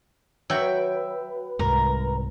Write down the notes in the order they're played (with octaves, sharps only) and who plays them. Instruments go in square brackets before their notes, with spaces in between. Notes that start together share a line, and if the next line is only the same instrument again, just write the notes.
[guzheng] F#3 [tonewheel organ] B4 [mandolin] E5 G5
[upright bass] C2 G#2 [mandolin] A#4